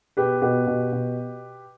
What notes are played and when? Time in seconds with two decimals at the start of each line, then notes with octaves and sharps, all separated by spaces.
0.17 B2 G4 B4
0.42 B2 G4 B4
0.67 B2
0.92 B2